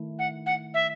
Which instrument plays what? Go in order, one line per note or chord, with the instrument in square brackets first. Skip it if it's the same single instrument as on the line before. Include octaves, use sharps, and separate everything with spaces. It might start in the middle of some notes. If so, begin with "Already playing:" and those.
Already playing: [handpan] D#3 A3 E4
[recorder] F#5
F#5
E5